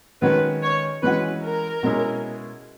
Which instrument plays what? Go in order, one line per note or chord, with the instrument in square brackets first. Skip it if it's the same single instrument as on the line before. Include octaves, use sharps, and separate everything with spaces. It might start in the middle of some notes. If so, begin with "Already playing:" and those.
[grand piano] D#3 G#3 C#4 F#4 [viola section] B4
[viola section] C#5
[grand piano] E3 G#3 C#4 F#4 [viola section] B4
[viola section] A#4
[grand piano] B2 G#3 C#4 E4 G#4